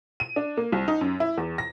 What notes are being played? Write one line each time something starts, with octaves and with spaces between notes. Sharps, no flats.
D#7
D4
A#3
C2
D#4
F#2
E4
E2
A#6